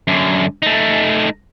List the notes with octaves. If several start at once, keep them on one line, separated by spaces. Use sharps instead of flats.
F#2 D3
A3 D#4